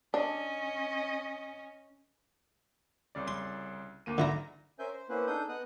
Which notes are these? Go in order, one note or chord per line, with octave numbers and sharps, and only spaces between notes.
C#4 D4 D#5
C2 C#3 D5
C6
D2 A#3 D#7
G#2 D3 E4 A#5
C#4 A#4 C5 E5 G#5 G6
C5
A#3 B3 C#4 E4 B4 C5
D4 D#4 G#4 A4 D#6 G6
B3 D#5 D#6 F#6